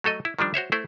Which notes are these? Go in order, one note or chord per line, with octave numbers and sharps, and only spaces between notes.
F#3 A3 A4 D#5
E4
D#3 F3 G3 D4
F#4 C5 C#5 E5
A3 E4 C5